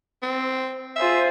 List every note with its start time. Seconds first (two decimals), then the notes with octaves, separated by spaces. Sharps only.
0.22 C4
0.96 F4 G#4 C5 E5